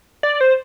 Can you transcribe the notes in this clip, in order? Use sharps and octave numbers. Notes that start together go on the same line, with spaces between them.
D5
C5